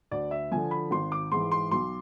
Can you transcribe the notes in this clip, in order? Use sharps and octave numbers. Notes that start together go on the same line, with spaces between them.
D2 D5
E5
D3 F3 G#5
B5
G#1 C6
D6
G#2 E3 C6
C6
B1 C6